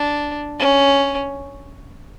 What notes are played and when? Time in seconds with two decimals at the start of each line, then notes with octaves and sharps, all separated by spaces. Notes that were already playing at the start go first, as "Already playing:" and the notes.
Already playing: D4
0.59 C#4